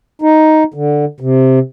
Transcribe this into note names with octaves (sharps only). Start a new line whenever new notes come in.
D#4
D3
C3